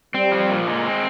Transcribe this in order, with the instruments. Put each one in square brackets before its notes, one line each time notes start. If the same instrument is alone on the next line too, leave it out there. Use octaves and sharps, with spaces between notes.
[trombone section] G3 [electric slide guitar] C4
[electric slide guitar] F3
A#2
G#3
C4